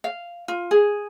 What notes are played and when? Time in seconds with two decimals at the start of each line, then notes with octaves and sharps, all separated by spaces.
0.04 F5
0.48 F4
0.71 G#4